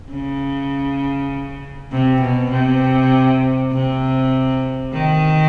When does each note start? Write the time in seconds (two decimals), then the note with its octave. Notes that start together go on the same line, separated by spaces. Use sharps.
0.11 C#3
1.92 C3
2.21 B2
2.51 C3
3.72 C3
4.93 D#3